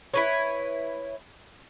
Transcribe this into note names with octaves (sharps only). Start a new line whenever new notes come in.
E4 B4 C#5